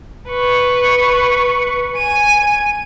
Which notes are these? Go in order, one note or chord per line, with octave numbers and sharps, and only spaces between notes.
B4 C#6
G#5 D#7